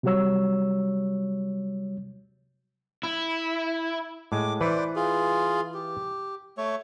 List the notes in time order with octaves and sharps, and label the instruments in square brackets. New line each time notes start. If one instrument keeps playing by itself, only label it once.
[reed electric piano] C3 F#3 G3 F#4 C#5 E6
[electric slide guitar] E4
[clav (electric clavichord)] A2 G#3 [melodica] D6
[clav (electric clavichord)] E3 B4 [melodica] C5 D5
[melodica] F4 G#4
G4
A3 C#5